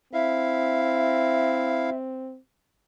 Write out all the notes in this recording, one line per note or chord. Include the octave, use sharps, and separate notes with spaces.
C4 E4 E5 F5